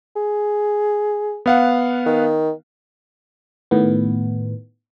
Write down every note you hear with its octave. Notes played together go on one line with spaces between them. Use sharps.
G#4
B3 F5 F#5
D#3
A2 D#3 B3